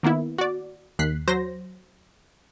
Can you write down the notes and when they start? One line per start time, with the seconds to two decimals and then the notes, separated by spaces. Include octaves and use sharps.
0.03 D#3 A#3 B3 E4
0.38 F#4 D5
0.99 D#2 F#6 B6 C7
1.28 F#3 C5 A#6